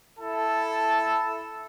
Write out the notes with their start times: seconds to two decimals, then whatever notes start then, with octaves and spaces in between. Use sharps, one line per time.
0.19 E4 A4 A5